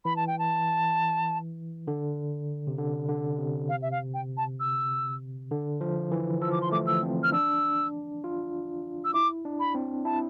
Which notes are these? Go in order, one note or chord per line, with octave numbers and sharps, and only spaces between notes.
E3 B5
A5
G5
A5
D3
C3
D3
D3
C3
F5
E5
F5
G5
A5
E6
D3
F3
E3
F3 E6
D6
C6
A3 D6
E6
C4
F6
D4 E6
F4
E6
E4 D6
D4
B5
C4
E4 A5